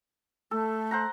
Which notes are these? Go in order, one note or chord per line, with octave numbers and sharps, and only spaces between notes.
A3 A4
C5 F#5 A#5